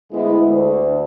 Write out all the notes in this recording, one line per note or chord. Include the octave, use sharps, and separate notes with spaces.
D2 G#3 B3 E4
D2